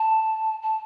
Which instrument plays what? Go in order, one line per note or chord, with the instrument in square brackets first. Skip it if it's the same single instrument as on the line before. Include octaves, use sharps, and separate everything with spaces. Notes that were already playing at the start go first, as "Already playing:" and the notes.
Already playing: [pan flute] A5
A5